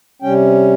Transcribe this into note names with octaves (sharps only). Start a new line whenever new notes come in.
C3 G3 C#4 G5